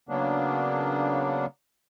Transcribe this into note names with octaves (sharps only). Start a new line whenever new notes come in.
C#3 F#3 A#3 B3 D4